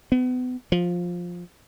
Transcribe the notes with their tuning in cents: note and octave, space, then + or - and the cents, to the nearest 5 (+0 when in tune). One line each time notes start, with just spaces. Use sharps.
B3 +35
F3 +10